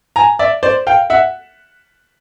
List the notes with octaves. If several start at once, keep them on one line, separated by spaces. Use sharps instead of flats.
G#5 A#5
D5 E5
C5 D5
F5 G5
E5 F#5